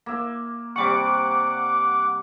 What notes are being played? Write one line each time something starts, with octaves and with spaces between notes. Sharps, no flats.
A#3 E5
C3 G3 F#5 C#6 D6